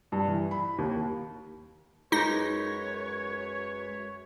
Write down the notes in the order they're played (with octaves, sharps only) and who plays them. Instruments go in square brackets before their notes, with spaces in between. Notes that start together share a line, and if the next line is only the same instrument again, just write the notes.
[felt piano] G2
E3
B5
D#2
[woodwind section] F#2 B4 C#5 [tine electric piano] G#3 [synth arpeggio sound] D#4 A#6